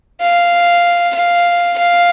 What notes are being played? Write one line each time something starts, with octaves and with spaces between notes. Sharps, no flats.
F5
F5
F5